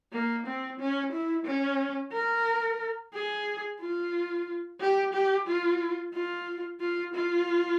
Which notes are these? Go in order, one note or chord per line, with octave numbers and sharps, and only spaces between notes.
A#3
C4
C#4
E4
C#4
A#4
G#4
F4
G4
G4
F4
F4
F4
F4